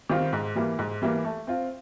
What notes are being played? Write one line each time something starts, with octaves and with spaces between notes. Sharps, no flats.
D#3 G3 C4 F4
G#2
E3 G3 A#3
G#2
E3 G3 A#3
A3
C4 F4